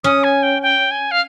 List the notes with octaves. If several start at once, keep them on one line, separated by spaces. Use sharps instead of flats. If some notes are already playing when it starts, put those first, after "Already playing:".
C#4 D#6
G#5
G5
G5
G#5
F5